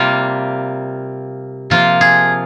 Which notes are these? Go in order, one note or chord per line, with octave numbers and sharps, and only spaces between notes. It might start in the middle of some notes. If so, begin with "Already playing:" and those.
Already playing: C3 G3 A#3 F4
C3 F3 A#3 F4
G#4